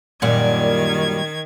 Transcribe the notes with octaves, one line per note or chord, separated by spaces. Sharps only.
F#2 A#2 D#3 G3 G#6